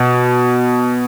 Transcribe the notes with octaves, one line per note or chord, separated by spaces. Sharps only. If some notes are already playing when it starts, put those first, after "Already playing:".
Already playing: B2